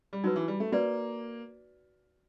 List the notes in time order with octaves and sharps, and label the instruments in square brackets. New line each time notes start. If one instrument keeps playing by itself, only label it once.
[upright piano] G3
[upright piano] F#3 [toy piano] D#4 F#4 B4
[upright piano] E3
G3
A3
[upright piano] A#3 [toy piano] F#4 B4 D5